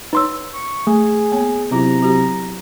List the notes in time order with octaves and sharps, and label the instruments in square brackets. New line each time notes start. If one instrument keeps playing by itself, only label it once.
[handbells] D#4 C6 E6 [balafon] B4 C#5
[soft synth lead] C#6
[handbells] A3 [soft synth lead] G#4
[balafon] A#3 B3 C#5
[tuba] C3 [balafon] F#3 E4 F4 [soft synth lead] A#5
[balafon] F#3 F#4 G4